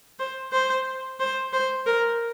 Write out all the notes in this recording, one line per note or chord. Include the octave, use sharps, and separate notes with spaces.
C5
C5
C5
C5
A#4